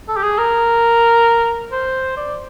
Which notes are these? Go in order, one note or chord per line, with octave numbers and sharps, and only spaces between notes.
A4
G4
G#4
A#4
C5
D5